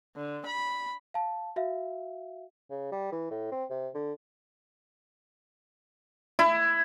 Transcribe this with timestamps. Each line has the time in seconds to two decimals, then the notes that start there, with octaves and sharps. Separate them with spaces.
0.16 D3
0.46 B5
1.14 F5 A5
1.56 F#4 E5 F5
2.70 C#3
2.92 G3
3.12 E3
3.31 A2
3.52 C4
3.70 C3
3.95 D3
6.39 E4